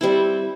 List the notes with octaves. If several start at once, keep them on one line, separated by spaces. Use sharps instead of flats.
G3 C4 E4